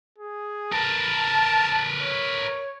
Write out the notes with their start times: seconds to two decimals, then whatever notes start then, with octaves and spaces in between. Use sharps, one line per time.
0.19 G#4
0.73 A#4 B4 A5
2.01 C#5